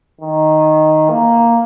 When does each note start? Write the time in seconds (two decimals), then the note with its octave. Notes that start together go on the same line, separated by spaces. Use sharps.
0.21 D#3
1.10 A#3